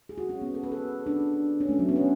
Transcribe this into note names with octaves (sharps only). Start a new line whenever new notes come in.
G#4
F#4
C#4
B3
A4
B4
A4
D4
C#4
A3
F#3
B3
C#4